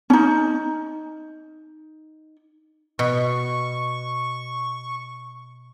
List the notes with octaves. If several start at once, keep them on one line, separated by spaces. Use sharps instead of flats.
C#4 D#4
B2 C#6